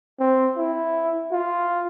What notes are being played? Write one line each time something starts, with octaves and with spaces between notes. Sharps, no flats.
C4
E4
F4